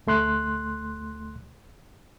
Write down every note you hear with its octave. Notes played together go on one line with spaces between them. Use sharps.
D2 A3 C6 F#6